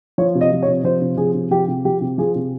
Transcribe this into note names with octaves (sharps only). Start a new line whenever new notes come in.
F3 C#5
C3
D#5
F3
C#5
C3
F3 C5
C3
F3 G#4
C3
F3 G4
C3
F3 G4
C3
F3 G#4
C3